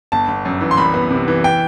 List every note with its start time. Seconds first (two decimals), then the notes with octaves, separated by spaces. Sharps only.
0.12 G1 A5
0.28 G1
0.45 F#2
0.61 E3
0.71 C6
0.77 C2 B5
0.94 B3
1.11 C3
1.28 E3
1.44 G5